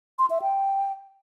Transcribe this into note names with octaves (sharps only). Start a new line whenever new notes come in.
C6
E5
G5